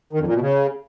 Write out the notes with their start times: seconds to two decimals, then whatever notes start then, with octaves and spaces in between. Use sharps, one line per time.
0.13 D#3
0.20 F2
0.27 A#2
0.34 B2
0.41 C#3